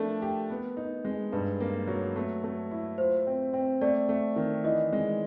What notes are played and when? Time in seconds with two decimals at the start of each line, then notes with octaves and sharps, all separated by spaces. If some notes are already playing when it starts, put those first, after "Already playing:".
Already playing: F3 A3 D4 A4 A#4
0.22 G4
0.50 B3
0.77 D#4
1.05 G#3
1.32 G2 B4
1.60 A#3
1.88 F#3
2.16 A3
2.44 A3
2.71 E4
2.98 F4 C5
3.27 C4
3.54 C4
3.81 A3 D5
4.09 A3
4.36 D#3
4.64 E3 D#5
4.93 G#3